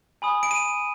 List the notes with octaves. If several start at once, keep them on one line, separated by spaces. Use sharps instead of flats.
G#5 B5 D#6
D7
D#7